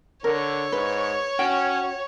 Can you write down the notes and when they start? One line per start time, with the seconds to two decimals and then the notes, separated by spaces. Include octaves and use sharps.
0.24 D3 A#4 C#5
0.72 G#2 B4
1.39 C#4 F#4 G5